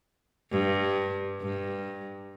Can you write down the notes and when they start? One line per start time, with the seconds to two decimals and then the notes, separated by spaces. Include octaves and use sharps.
0.51 G2
1.41 G2